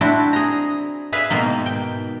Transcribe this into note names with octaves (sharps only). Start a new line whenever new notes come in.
C4 D4 E4 F#4
G#4 A#5
G#4 B4 E5 F5
G#2 B2 D#3 A#3
G5